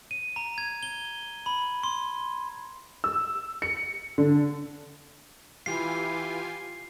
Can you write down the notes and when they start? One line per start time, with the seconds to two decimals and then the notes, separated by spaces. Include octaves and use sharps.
0.11 D#7
0.36 A#5
0.58 G#6
0.83 G7
1.46 B5
1.83 C6
3.04 E6
3.62 C#7
4.18 D3
5.66 E3 F4 G4 G#5 C7